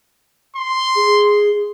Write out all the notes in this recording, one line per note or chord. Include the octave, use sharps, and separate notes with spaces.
C6
G#4